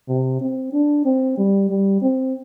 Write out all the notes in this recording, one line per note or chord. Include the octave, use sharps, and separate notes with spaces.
C3
C4
D4
C4
G3
G3
C4